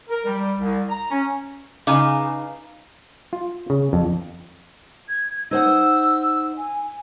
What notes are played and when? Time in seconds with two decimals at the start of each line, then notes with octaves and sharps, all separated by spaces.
0.09 A#4
0.26 G3
0.59 C2
0.89 A#5
1.11 C#4
1.87 C#3 D#4 B4 D#5 F5 G#5 A#5 D6
3.33 F4
3.70 C#3
3.93 F2
5.09 G#6
5.51 D#4 C5 F#5 E6
6.58 G#5